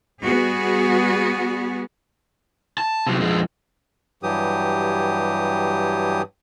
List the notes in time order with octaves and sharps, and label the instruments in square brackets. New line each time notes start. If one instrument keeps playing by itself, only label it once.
[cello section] G3 B3 F#4 G#4
[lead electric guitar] A5
C3 F#3
F2 G#3
[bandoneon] G2 E3 F#3 G4 D#6